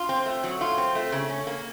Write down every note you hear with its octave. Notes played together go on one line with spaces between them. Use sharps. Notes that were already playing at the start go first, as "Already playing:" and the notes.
Already playing: F4
C4
A3
F#3
F4
C4
A3
C#3
C#4
A#3